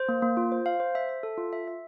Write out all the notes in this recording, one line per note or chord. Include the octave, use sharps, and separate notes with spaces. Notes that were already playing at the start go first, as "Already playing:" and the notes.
Already playing: C5
A#3
A#3
F4
C5
F5
C5
E5
E5
A4
F4
E5
E5